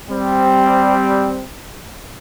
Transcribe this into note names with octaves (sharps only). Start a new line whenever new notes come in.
G3 C4